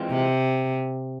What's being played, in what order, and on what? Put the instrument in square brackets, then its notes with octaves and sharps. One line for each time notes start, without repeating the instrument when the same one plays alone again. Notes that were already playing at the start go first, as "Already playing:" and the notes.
Already playing: [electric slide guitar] E3 G#3 C4 F4
[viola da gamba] C3